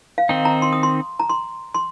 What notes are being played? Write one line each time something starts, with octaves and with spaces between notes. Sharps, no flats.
F5
D#3 C4 D#4 G5
A#5
C6
D#6
C6
A#5
C6
C6